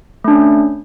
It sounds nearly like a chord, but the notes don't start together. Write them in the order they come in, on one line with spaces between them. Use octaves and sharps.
A3 D4 C#4